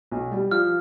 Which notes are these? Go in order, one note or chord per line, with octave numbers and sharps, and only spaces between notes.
B1
G3
F3 F6